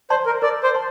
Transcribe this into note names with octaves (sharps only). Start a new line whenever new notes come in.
C5 D5 A5 C6
A#4
A#4 D5
C5
A5 C6